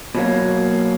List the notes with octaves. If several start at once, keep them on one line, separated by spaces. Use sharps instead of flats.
B2 F#3 A#3